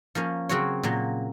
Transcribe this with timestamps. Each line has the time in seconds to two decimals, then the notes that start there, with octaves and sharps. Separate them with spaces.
0.15 F3 A#3 C#4
0.49 C#3 F#3 C4 F#4 C#5
0.83 A#2 F#3 A#3